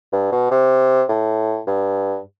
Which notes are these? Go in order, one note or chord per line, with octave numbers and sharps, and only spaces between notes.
G2
B2
C3
A2
G2